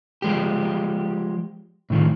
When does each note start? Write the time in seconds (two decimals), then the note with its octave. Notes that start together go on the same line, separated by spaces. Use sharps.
0.22 F3 G#3 G4
1.90 A2 D#3 F3